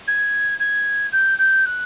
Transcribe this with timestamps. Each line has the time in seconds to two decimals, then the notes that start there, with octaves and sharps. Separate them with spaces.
0.08 G#6
0.60 G#6
1.12 G6
1.38 G6
1.65 F#6